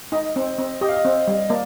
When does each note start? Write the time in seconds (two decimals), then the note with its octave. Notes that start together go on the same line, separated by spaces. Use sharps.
0.12 D#4 D#5
0.36 C4
0.59 C4
0.81 G4 D#5
0.89 F5
0.96 D#5
1.05 C4
1.27 G3
1.50 A#3 D5